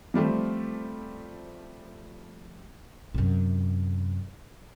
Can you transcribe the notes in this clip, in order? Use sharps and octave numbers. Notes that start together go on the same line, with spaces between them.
F3 G3 A3 C4
F#2 C3